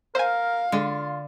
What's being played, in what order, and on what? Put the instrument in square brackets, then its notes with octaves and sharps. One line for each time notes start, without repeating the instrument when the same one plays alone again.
[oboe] A#4 [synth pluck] C5 G#5 [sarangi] F5
[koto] D3 [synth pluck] G#3 [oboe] F4